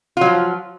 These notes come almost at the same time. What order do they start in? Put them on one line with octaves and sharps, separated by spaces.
F4 F#3 F3